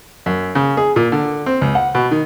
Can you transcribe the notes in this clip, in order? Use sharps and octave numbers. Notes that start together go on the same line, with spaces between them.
F#2
C#3
G#4
A#2
D3
C4
C#2
F#5
B2
D#3